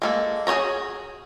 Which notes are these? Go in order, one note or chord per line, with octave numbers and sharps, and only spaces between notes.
G#3 A#3 A4
F#4 G#4 C5 C#5 A#5